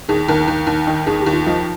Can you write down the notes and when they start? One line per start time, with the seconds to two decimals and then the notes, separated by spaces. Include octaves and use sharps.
0.09 D#2 G#4
0.28 D#2 A#4
0.48 D#2
0.67 D#2
0.87 D#3
1.06 D#2 G#4
1.20 G4
1.26 D#2
1.32 F4
1.46 F3 D#4